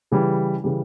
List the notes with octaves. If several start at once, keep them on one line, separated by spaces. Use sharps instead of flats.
C#3 E3 G3
C#3 E3 G3